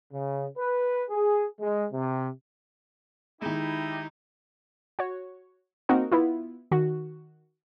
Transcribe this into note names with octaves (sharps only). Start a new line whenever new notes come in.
C#3
B4
G#4
G#3
C3
D#3 G#3 D#4 E4 G4
F#4 C#5
A#3 C4 D#4 F#4 A#4
B3 E4 F4
D#3 F#4